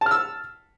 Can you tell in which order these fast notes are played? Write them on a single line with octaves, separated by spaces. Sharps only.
A5 F6 E6